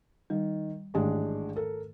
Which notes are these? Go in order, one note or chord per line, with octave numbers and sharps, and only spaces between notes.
D#3 G3
A1 G#2 D#3 G#3 A3 D4
A4 A#4